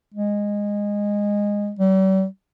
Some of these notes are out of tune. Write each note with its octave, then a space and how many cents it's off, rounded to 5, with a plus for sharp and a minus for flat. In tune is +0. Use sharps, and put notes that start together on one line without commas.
G#3 -15
G3 -45